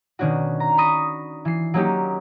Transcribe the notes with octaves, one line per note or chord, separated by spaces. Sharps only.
B2 D#3 C#4 D4 F#4
A#5
B5 C#6 D#6 A#6
E3 C7
F#3 A#3 C#4 D#4 G4